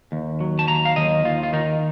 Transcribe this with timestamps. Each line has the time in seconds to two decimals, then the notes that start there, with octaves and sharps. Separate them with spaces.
0.12 D#2
0.40 F#3
0.59 A5
0.68 D#2 A#5
0.85 F5
0.96 D#2 D#5
1.24 D#2 F4
1.43 F4
1.53 D#3 D#4